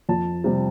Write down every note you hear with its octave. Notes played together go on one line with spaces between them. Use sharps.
F2 A5
C3 G3